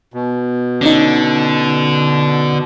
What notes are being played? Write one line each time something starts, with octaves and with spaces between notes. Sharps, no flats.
B2
D3 C#4 D#4